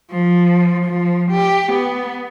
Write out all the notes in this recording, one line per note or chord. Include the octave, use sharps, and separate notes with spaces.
F3
F3
G4
B3